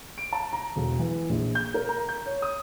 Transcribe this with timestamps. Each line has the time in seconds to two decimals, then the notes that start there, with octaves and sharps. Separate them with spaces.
0.18 D7
0.33 A5
0.53 A#5
0.76 E1
0.99 E3
1.29 A#1
1.55 G6
1.74 A#4
1.89 A#5
2.09 G6
2.26 C#5
2.42 D#6